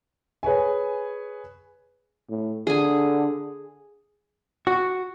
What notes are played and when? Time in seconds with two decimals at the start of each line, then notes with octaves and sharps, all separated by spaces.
0.43 G#4 B4 C#5 G#5
2.29 A2
2.67 D3 G#4 G#5
4.67 F#4